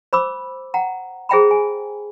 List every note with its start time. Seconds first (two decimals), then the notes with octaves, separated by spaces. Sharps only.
0.13 C5 B5 D6 E6
0.74 F#5 G5 A#5
1.29 G#4 C5 E5 G5 A#5 B5
1.51 G#5